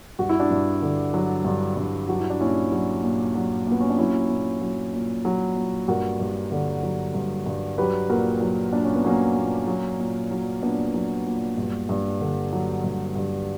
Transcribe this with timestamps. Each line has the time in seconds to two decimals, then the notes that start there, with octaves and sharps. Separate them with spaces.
0.19 G2 F#4
0.29 E4
0.40 D4 F#4
0.51 G2
0.82 D3
1.14 F#3
1.45 G2
1.77 G2
2.09 F#3 F#4
2.19 E4
2.30 D4
2.40 A#2 C#4 E4
2.72 F#3
3.03 A#2
3.35 F#3
3.67 A#2 B3
3.80 C#4
3.90 D4
3.99 F#3 C#4 E4
4.30 A#2
4.61 F#3
4.93 A#2
5.25 F#3
5.56 A#2
5.88 G2 F#4 A#4
6.20 G2
6.52 D3
6.83 F#3
7.14 G2
7.46 G2
7.78 F#3 G4 B4
8.09 A#2 F#4 A#4
8.41 F#3
8.73 A#2 D4
8.84 C#4
8.95 B3
9.05 F#3 A#3 C#4
9.36 A#2
9.68 F#3
9.99 A#2
10.31 F#3
10.63 A#2 B3 D4
10.94 F#3
11.26 A#2
11.58 G2
11.89 G2
12.21 D3
12.53 F#3
12.84 G2
13.16 G2